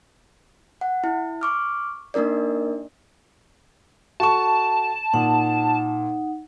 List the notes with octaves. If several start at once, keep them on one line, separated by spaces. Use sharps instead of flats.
F#5
E4
C#6 D6 F6
A#3 D4 D#4 A#4 D5
F#4 A4 A5 C#6
A#2 D#4 F#5